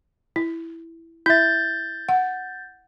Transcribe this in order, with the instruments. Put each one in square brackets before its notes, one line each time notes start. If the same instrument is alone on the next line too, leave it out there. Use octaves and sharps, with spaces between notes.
[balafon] E4
[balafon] E4 E5 [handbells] G6 A6
[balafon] F#5